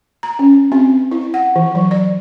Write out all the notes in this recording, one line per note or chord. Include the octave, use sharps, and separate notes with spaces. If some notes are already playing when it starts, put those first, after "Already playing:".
A#5
C#4
C4
E4
F#5
E3
F#3
D5